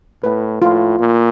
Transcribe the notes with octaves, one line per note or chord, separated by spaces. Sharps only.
A2 B4
A2 F4
A#2